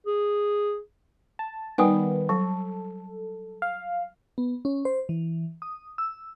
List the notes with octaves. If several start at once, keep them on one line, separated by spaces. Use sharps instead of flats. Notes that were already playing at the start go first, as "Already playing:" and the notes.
G#4
A5
D#3 G3 B3 G5 G#5
F#3 A4
F5
B3
C#4
C5
E3
D#6
E6